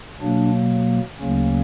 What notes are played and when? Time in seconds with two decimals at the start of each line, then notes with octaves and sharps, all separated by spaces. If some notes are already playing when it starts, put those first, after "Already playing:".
0.20 B2 F#3 A#3 D4
1.19 D2 C#3 F#3 A#3 C#4